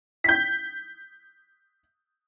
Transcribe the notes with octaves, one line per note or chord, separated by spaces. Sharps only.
G6 B6